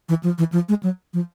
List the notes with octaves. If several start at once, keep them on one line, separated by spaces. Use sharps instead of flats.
E3
F3
E3
F3
G#3
F#3
F3